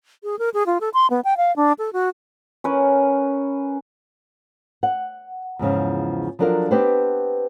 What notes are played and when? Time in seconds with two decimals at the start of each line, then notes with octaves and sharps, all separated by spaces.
0.24 G#4
0.39 A#4
0.54 G#4
0.66 F4
0.81 A4
0.94 C6
1.10 B3
1.25 G5
1.37 F5
1.56 D4
1.79 A4
1.93 F#4
2.64 C#4 A#4 B4
4.83 F#5
5.59 E2 G#2 C#3 F3
6.39 F3 F#3 D4 A4 A#4 F5
6.71 B3 C4 D4 G4 B4 C5